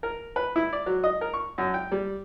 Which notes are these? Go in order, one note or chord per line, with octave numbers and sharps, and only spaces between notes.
A#4
B4
E4
D5
F#3
D#5
A#4
C#6
F#2
G5
G3